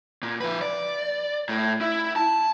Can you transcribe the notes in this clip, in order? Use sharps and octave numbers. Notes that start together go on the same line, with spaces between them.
A#2
F3 B4
D5
A2
E4
A5